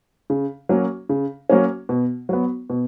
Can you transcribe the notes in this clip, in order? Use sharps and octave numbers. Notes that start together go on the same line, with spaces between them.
C#3
F#3 A#3 C#4
C#3
F#3 A#3 C#4
B2
F#3 B3
B2